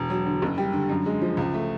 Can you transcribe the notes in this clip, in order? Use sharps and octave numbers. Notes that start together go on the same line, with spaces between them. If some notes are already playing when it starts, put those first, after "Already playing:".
Already playing: E1
F#3
D3
F#1
G3
D3
F#2
G#3
F3
C#2
A3